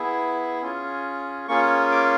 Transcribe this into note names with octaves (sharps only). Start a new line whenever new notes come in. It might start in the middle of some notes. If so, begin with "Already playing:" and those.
Already playing: B3 E4 G#4
C#4 F4 G#4
A#3 C#4 F4 G#4 C#6
D6